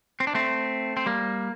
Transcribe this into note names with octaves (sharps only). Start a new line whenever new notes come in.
C4
D4
A3 C4
C4
G3 A#3